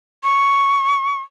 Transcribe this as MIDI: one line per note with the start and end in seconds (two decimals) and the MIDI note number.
0.24 1.20 85